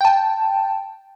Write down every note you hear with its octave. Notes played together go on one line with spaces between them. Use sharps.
G5 A5